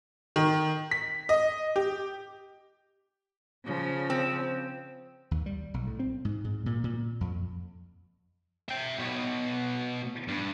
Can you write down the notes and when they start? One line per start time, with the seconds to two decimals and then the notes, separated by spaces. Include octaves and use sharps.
0.36 D#3
0.91 B6
1.29 D#5
1.76 G4
3.65 C#3 F3
4.10 C4
5.31 D#2
5.46 G3
5.74 B1
5.87 A2
5.99 C4
6.25 G#2
6.44 G#2
6.66 A#2
6.84 A#2
7.21 F2
8.69 E5 G5
8.98 B2 C#5
10.28 G2